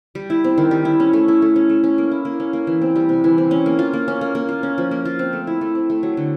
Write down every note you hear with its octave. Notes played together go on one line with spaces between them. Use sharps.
G3
E4
C4
D#3
G3
E4
C#4
A3
E4
A3
C#4
A3
C#4
A#3
E4
A#3
C#4
A#3
E3
C4
G3
C3
E3
C4
C#4
A#3
F4
A#3
C#4
A#3
A#3
F4
C#4
F3
A#3
F4
C4
A3
E4
A3
C4
A3
F#3
D3